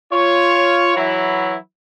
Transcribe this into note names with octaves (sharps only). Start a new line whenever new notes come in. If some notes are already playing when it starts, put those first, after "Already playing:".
F4 C#5
E3 F#3 E4